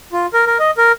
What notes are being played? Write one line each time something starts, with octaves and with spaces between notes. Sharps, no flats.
F4
A#4
A#4
D#5
A#4